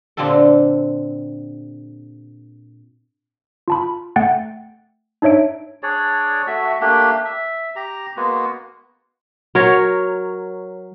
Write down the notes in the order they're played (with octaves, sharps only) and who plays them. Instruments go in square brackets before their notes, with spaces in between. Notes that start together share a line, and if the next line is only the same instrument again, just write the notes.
[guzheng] A#2 D3 C4 F4 G4 A4
[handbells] F4 A5 B5
A3 F#5 G5 A6
D4 D#4 C#5 E5 D7
[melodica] D4 G#4 C#5 D5
A3 F#4 E5
A3 A#3 D4 G4
E5
G4 A#5
G#3 A#3 B3 F#4
[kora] F#3 A#4 C#5